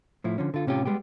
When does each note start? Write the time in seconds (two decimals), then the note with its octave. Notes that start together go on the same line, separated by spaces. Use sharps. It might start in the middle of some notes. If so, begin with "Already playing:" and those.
0.24 A2 F3 E4
0.38 D3 F3 C#4
0.54 D3 F4
0.67 A2 C3 C#4 F4 G4
0.86 G3 G#3 B3 G4